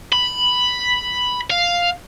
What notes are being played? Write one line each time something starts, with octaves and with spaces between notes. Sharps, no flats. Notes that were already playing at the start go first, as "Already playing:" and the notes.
B5
F5